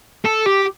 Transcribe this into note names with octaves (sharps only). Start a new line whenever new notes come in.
A4
G4